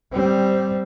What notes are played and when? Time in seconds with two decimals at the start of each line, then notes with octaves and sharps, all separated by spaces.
0.13 G3 C4